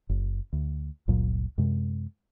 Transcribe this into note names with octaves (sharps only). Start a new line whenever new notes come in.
F#1
D2
G1 C#2 A#2 F#3
F#2 C3 G#3